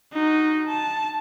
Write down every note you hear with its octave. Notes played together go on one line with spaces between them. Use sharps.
D#4 F#4
A5